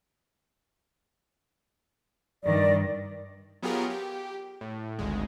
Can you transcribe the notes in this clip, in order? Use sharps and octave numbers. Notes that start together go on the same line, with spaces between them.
G2 D#3 D5
F#3 B3 F4 G4 G#4 A#4
G4
A2
G#1 D2 G#3